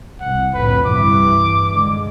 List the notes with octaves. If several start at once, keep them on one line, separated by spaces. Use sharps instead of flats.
C2 F#5
F2 A2 D3 B4
C2 G2 E3 D6
D3 G#3